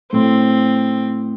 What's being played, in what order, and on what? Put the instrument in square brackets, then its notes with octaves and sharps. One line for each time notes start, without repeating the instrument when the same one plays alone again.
[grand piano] A2 [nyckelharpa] C4